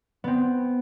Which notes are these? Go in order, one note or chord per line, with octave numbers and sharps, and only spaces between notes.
B3 C4